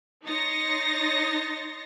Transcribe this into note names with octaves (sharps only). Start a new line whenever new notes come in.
D#4 C#5 C6 A6 A#6 C#7